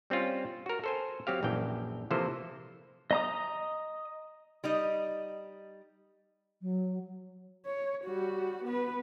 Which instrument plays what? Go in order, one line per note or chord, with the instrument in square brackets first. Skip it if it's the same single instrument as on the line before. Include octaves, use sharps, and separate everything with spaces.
[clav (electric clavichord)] G3 C4 C#4 F4
F#4 A#4
A4 C5 G#5
F#3 C4 G4 F5
A#1 F#2 E3 G5
C3 E3 F3 A#3 A4 C5
[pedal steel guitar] D#5 A#5 D#6
[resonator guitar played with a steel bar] G3 D#4 D#5
[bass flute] F#3
[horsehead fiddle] C#5
G3 F#4
B3 B4